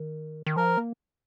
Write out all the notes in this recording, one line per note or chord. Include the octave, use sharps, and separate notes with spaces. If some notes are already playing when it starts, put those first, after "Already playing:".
Already playing: D#3
D#3
F3 A#4
A#3